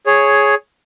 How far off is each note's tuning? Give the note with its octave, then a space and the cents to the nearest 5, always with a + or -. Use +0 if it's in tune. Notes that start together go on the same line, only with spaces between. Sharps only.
G#4 +5 C#5 +0